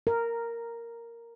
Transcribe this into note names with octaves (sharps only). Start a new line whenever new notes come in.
A#4